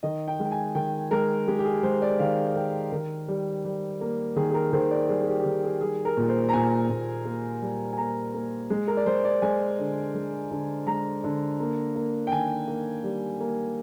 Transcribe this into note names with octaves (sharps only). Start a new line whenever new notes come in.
D#3 D#5
G5
G#3
G5
G#5
D#3 G5
G#3 A#4
G#3 G4
G4
G#4
G#3 C5
D5
D#3 F5
D#3 G5
D#3 A#4
G3
G3
A#3
D#3 G#4
G#4
A#4
D#3 C5
D5
G3 G#4
G#4
G4
G4
D#3 G#4
G#4
G3 G#4
A#4
A#2
C5
A#5
A#2 G#5
A#2
A#3
G3
G#5
A#3 A#5
A#3
G#3
A#4
D5
G#3 C5
D5
G#3 G#5
D3
G#3
D3
G#3 A#5
D3
A#3
A#3
G5
D#3 G#5
A#3
G3
A#3